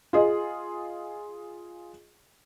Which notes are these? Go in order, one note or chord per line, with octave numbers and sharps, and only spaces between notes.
F4 G#4 D#5